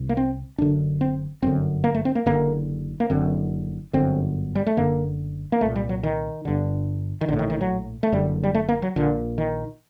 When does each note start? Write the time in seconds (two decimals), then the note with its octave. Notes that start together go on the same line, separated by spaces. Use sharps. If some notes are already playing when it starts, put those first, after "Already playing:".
Already playing: C2 C3
0.09 A#3
0.17 C4
0.58 F#1 F#2 D3 D4
1.01 C4
1.42 G1 F#2 D3 C4
1.84 A#3
1.95 A3
2.05 C4
2.15 A#3
2.26 F#1 F#2 D3 A#3
3.00 A#3
3.10 F#1 F#2 D3 C4
3.93 G1 F#2 D3 C4
4.55 G3
4.66 A3
4.77 F#1 F#2 D3 A#3
5.52 A#3
5.61 C2 A#2 A3
5.76 G3
5.89 F#3
6.03 D#3
6.45 G1 G2 D3
7.21 D#3
7.28 A#1 A2 D3
7.39 D#3
7.50 D#3
7.61 F#3
8.03 A3
8.12 F#1 F#2 D3 G3
8.43 G3
8.55 A3
8.69 A#3
8.82 F#3
8.96 A#1 A#2 D3
9.38 D#3